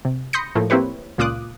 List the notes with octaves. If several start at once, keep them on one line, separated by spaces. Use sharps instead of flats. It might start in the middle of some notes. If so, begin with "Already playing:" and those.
C3
B5 C6 D#6 G6 A#6 C#7
A2 F3 A3 A#3
A#3 C4 E4 G4 B4 C#5
C#2 A#2 F4 D6 D#6 F#6